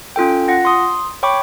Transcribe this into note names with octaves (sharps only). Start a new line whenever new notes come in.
C#4 F4 A4 G5
F4 F#5 A#6
C6 D#6
C#5 G5 B5 C#6 D6